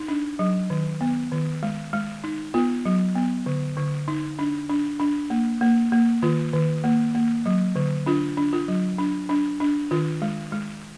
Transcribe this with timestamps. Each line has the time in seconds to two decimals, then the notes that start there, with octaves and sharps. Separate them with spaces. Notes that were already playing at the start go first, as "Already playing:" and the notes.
Already playing: D#4
0.08 D4
0.39 F#3
0.70 D#3
1.01 B3
1.32 D#3
1.63 G#3
1.93 G#3
2.24 D#4
2.54 B3 F4
2.85 F#3
3.15 B3
3.46 D3
3.77 D3
4.08 D#4
4.39 D4
4.69 D4
5.00 D4
5.30 A#3
5.61 A#3
5.92 A#3
6.22 D#3 F4
6.53 D#3
6.84 A#3
7.15 A#3
7.46 F#3
7.76 D3
8.06 D4 F4
8.37 D4
8.53 F4
8.68 F#3
8.98 D4
9.29 D4
9.60 D4
9.91 D#3 F4
10.22 G#3
10.52 G#3